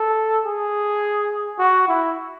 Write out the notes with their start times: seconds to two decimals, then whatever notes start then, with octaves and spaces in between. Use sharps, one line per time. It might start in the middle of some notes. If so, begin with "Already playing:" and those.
Already playing: A4
0.46 G#4
1.59 F#4
1.88 E4